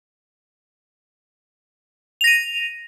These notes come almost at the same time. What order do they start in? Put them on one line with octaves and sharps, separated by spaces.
F7 A#6 D#7